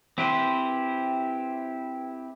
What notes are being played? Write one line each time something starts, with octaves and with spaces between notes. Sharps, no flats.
C4 E4 G4 B4 C5